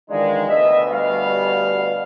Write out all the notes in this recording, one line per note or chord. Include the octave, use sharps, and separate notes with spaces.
D#3 E3 G#3 D4 D#4 F4
D2 B2 D#5 E5
G3 F5